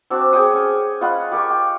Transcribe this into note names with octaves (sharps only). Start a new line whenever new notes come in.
C4 D4 F#4
G#4 C#5 G5 D#6
C#4 C#5
F4 D#5 F#5 B5
G4 A#4 C#6
G5